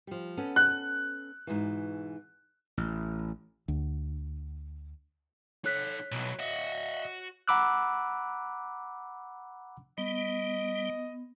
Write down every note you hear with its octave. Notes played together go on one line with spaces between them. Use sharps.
F3 G3
B3 C#4 A4
F#6
G#2 B2 E3
A1
D2
D#4 A4 C#5 F#6 B6
B1 E3 F#3
F#4 D#5 E5
F#5 A#5 B5 D6 E6 F#6
G3 B3 D#5